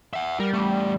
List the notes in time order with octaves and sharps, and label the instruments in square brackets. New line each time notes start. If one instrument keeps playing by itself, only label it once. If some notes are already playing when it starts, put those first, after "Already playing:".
[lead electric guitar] E5 F#5
[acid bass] G3 [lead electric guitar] A#4
[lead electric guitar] E2 A3